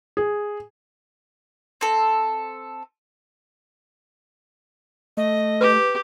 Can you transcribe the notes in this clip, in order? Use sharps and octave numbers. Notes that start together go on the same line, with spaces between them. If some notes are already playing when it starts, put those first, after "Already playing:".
G#4
C4 A4
A3 D#5
G4 B4